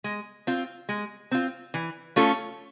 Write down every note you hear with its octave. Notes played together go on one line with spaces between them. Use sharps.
G#3
C4 F4
G#3
C4 F4
E3
A3 C#4 F4 A4